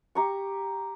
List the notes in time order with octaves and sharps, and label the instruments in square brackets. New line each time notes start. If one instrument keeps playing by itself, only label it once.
[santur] G4 A#5 C#6